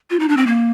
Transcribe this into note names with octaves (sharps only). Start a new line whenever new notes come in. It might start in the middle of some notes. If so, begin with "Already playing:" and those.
F4
D#4
D4
C4
A#3